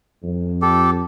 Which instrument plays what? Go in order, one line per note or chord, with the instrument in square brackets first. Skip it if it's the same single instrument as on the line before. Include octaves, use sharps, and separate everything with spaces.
[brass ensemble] F2
[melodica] G4 A4